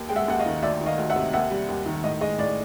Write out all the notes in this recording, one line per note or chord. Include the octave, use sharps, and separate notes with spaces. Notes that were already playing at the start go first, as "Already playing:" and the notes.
Already playing: D#2
G#3 G5
E5 F#5
D#2 F#5
D#5 F5
D#3
D2 D5 E5
D#3
D#5 F5
D2
E5 F#5
C3
D#2 E5 F#5
G3
D#2
D#3
A2 D#5
G#3 D#5
A2 D5